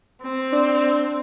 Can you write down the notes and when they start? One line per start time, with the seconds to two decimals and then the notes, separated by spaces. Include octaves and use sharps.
0.23 C4
0.53 D4